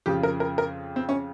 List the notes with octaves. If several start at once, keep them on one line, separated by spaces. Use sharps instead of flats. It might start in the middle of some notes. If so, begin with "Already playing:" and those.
F2 C#3 F3 G4
A#4
A#4
A#4
C4
C#4